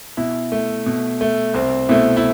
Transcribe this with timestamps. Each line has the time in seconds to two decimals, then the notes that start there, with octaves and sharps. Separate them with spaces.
0.17 B2 E4
0.52 A3
0.86 B2
1.21 A3
1.54 C2 C4
1.89 B2 A3 E4
2.17 E4